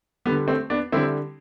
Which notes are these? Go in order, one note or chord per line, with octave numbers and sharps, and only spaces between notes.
D3 G3 B3
A3 C4
B3 D4
D3 G3 C4 E4